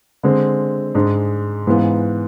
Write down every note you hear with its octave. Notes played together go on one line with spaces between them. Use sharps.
D3 G#3 C4
G#2 G#3 D4
G#2 E3 B3 F4